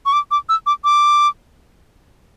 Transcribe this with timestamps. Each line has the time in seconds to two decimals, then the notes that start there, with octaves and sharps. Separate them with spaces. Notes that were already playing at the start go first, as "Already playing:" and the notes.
0.06 C#6
0.13 D6
0.31 D6
0.49 E6
0.66 D6
0.84 D6